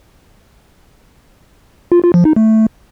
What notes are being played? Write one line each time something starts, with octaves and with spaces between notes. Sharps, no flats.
F4
F4
F3
D#4
A3